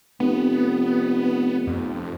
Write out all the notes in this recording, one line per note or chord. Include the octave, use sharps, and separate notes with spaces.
F1 B3
F2